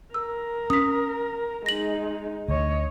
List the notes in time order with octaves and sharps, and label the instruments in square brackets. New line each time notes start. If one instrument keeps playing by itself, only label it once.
[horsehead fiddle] A#4 [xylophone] E6
[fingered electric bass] C#4 [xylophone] D#6 B6
[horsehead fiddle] G#3 D#4 [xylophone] A#6 F#7
[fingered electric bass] D2 [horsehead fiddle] C#5 D#5